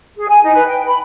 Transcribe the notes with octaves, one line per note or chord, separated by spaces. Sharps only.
G#4
G#5
D#4
B4
G5
B5